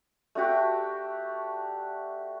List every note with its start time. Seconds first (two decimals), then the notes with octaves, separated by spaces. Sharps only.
0.35 A3 D4 F#4 G4